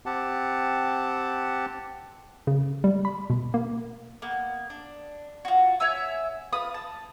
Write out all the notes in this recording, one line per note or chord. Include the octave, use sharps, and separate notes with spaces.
C4 G4 F#5 A5
C#3
G3
B5
B2
A#3
A#3 B3
D4
F4 F#4
C#5 E5 G#5 E6
F4 B4 D#6
A5